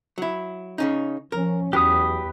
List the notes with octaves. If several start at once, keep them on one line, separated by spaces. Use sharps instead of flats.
F#3 E4
C#3 C#4 D#4
F3 C#4 A#4
E2 F#3 G4 B4 D#6